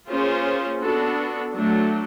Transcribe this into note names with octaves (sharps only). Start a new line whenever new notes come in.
A#3 C#4 F4 G#4 C5
B3 D4 F#4 A4
F#3 A3 D4